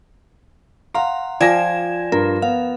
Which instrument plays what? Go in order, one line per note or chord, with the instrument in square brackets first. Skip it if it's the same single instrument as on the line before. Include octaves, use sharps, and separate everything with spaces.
[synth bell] F5 A#5 [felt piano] F#5 C6
[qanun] F3 [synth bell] D5 G#6 E7 [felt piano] G5 G#5 A#6
[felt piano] G2 F4 [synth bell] A#4
[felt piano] B3 [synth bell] F5